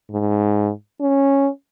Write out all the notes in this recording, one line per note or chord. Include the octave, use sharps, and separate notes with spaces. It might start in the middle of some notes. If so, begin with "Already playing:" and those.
G#2
C#4